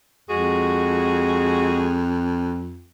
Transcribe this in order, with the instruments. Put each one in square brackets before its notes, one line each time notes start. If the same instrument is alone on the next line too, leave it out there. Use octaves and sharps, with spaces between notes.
[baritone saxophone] F2 [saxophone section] G#3 F#4 G#4